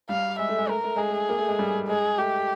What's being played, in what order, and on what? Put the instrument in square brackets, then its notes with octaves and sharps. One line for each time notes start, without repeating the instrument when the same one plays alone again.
[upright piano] G3 [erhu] F5
[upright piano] G#3 [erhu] E5
[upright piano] A3
G#3
[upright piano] A3 [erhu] A#4
[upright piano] A3
[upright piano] G#3 [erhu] G#4
[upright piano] A3
A#3
A3
G#3
G3
[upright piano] G#3 [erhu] G#4
[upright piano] A3 [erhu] G4